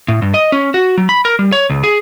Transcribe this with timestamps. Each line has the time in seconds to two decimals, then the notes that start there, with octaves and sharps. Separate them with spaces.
0.08 A2
0.22 G2
0.34 D#5
0.52 C#4
0.74 F#4
0.98 F#3
1.09 B5
1.25 A#4
1.39 G3
1.52 C#5
1.70 C#2
1.84 G#4